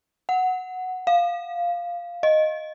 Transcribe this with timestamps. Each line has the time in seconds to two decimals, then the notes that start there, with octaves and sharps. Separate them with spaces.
0.29 F#5
1.07 F5
2.23 D#5